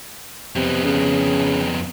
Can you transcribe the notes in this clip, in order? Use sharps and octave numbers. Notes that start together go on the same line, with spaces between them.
F2 C3 B3
C#3